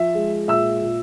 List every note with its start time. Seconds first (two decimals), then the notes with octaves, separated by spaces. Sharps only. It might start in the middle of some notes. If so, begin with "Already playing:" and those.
Already playing: F3 E5
0.15 G#3
0.48 A#2 E5 E6
0.82 A#2